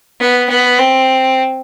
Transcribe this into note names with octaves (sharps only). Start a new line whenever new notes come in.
B3
B3
C4